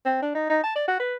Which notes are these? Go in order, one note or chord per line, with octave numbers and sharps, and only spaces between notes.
C4
D4
D#4
D#4
A5
D5
F#4
B4